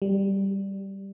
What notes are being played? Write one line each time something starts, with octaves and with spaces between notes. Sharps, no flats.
G3